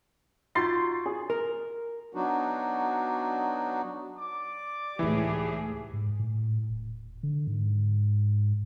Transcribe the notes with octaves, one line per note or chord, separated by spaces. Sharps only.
D#4 F4 F#4 C6 A6 C7
G#4
A#4
F#3 B3 D4 D#4 F#4
D5 D6
C#2 A2 E3 D#4 E4 G4 G#4
G#2
A2
D#1
D3
G#2